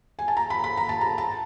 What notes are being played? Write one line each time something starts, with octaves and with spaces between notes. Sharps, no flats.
G#5
A5
A#5
B5
B5
A#5
A5
A#5
A5